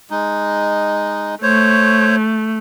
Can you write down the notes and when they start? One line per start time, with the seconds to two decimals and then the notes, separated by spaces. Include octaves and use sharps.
0.10 G#3 D#4
1.43 A3 C5 C#5